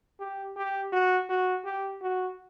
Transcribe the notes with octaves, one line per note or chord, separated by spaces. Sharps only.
G4
G4
F#4
F#4
G4
F#4